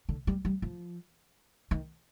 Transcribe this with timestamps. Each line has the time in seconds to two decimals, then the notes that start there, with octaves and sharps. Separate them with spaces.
0.09 D3
0.27 G3
0.45 G3
0.62 F3
1.71 D#3